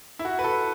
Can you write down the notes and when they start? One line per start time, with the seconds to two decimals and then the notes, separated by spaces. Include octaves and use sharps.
0.19 E4
0.25 F#4
0.39 B4
0.44 A4